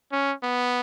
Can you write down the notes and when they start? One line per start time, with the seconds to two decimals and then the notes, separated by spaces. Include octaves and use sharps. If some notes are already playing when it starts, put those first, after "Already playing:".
0.12 C#4
0.43 B3